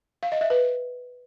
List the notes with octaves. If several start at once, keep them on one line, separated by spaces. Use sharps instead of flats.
F5
D#5
E5
B4